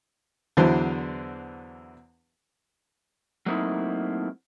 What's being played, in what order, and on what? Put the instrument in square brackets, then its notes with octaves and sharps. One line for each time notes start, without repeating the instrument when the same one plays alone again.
[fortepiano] E2 D3 E3 F#3 D4 C5
[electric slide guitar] F#3 A3 A#3 C4 D#4 E4